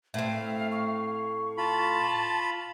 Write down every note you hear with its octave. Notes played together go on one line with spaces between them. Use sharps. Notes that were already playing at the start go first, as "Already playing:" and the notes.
A2 C4 E5 F5
C#6
F4 A5 B5